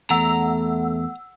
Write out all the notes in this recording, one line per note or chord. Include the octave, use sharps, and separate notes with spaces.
E2 A3 F#5 A#5 E6